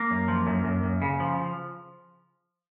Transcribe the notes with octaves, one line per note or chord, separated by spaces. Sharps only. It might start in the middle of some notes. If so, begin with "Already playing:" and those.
Already playing: A#3
F#2
F3
F#2
F#2
F#2
C#3
F3